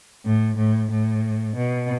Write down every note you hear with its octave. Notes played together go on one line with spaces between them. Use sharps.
A2
A2
A2
B2